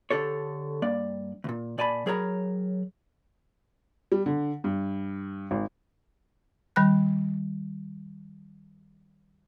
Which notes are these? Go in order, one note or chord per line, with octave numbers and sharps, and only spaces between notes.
D3 G4 A4 C#5
G2 A#3 D5
D2 A#2
A#2 D5 G#5 A5 B5
F#3 G#4 A#4 C#5 A#5 B5
G3
D3
G2
G#1
D#3 G3 B5 F#6